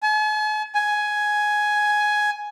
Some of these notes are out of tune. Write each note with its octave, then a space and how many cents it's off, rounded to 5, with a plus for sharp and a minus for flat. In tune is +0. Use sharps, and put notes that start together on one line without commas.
G#5 +45
G#5 +10